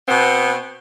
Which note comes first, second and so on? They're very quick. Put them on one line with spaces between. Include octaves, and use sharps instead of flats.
C4 B3 B2